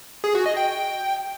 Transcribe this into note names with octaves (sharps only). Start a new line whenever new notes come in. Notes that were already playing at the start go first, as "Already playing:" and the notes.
G#4
F#4
D#5
G5